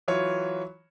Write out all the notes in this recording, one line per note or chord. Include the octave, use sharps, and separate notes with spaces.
E3 F#3 F4 C#5